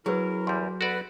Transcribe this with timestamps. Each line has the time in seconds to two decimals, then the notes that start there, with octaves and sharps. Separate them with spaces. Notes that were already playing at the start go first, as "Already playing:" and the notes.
0.06 F#3 C#4 E4 G#4 A#4 B4
0.47 E2 G3 C6
0.81 B3 F#4 A4 B4 D5